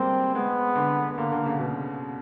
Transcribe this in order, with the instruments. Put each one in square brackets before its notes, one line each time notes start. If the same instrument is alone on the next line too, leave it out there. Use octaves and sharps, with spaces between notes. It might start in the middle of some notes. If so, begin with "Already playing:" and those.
Already playing: [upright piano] G3 G#3 A#3 [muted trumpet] C4
[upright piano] G#3 [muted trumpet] B3
[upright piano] D3
[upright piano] D3 [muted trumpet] A#3
[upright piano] D3
C#3
B2